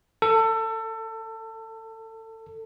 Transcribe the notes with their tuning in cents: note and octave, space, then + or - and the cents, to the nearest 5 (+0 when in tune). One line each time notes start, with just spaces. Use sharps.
A4 +25